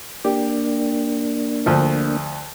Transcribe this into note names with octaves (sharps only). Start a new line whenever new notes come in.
A#3 D4 G4
D2 F3